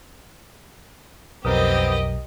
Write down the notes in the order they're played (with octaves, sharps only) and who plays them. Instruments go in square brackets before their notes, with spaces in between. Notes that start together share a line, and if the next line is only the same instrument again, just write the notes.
[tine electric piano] B1 [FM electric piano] F2 A#4 D#6 [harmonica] B3 C4 [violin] G4 D#5